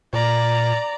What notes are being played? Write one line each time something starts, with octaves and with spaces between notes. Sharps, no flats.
A#2 D5 A#5